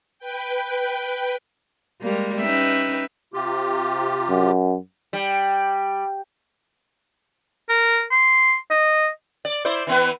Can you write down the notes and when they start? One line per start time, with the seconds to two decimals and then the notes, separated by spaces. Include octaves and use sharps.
0.19 B4 G5
2.01 G3 G#3 A#3
2.42 C#4 D#4 B4 E5 G5
3.34 C3 F4 G4
4.29 F#2
5.13 G3
7.69 A#4
8.12 C6
8.71 D#5
9.45 D5
9.65 E4 C5 D5
9.87 E3 B3 B4